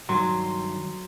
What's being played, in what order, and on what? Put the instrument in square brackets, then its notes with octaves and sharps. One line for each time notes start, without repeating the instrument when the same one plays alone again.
[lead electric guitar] G2 D#3 [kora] F#3 [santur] C6